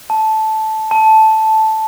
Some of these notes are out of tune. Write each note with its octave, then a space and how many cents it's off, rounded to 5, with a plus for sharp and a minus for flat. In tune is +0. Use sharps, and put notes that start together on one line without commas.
A5 -10
A5 -5